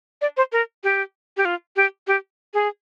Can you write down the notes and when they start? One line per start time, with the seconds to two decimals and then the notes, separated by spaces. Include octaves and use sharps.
0.21 D5
0.37 C5
0.52 A#4
0.84 G4
1.37 G4
1.45 F4
1.76 G4
2.07 G4
2.54 G#4